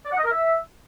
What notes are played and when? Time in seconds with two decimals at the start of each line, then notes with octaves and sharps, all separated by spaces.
0.05 D5
0.12 F#5
0.18 D#5
0.24 A#4
0.31 E5